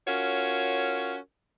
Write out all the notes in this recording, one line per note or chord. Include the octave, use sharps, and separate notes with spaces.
C#4 F4 F#4 A#4 C#5